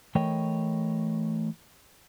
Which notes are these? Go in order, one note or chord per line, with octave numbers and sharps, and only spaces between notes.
E3 A3 A#4 C#5 D#5 G5